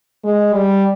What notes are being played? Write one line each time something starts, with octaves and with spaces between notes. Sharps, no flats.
G#3
G3